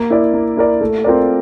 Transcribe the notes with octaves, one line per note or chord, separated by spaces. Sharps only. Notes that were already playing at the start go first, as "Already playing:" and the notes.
Already playing: A#3
E4 A#4 D5
A#3
E4 A#4 D5
A3
C4 F4 A#4 D5